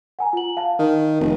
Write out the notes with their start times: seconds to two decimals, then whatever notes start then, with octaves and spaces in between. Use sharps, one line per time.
0.19 F#5 G#5 A#5
0.33 F4 F#7
0.57 F5 A5
0.79 D#3
1.20 F1